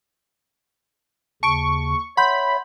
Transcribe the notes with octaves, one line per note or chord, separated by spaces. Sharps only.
D#2 C#3 A5 C#6 D7
C#5 E5 F#5 B5 C6 G6